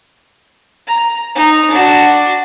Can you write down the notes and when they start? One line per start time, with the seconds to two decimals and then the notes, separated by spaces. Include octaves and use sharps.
0.87 A#5
1.36 D#4
1.71 D4 F#4